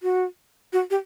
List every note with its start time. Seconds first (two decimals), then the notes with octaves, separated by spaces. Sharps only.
0.03 F#4
0.73 F#4
0.90 G4